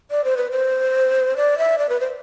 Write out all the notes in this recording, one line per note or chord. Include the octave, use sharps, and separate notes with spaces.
D5
C5
B4
C5
D5
E5
D5
B4
C5